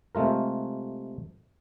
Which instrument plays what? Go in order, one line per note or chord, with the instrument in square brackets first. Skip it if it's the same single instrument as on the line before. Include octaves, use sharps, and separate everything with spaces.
[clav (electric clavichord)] C3 G#3 A3 F4 A#4